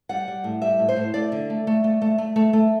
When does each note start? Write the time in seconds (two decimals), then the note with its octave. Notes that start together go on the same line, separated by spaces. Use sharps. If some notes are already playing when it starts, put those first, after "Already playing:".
0.09 G3 F#5
0.28 G3
0.44 A2
0.62 G3 E5
0.79 A2
0.88 C5
0.96 A2
1.14 A3 D5
1.32 D3
1.50 A3
1.67 A3
1.84 A3
2.02 A3
2.18 A3
2.36 A3
2.53 A3